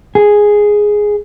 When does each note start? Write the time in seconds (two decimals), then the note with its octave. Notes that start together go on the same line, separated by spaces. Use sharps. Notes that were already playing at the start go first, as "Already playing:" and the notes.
0.15 G#4